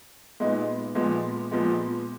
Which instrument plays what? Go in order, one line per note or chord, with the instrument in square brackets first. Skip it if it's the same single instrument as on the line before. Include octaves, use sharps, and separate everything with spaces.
[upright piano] A#2 G#3 B3 D#4
A#2 F3 G#3 B3
A#2 F3 G#3 B3